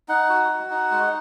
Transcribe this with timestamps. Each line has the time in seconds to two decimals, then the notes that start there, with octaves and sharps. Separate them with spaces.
0.08 D#4 F#5
0.29 F#4
0.49 F#4
0.70 D#4
0.91 G#3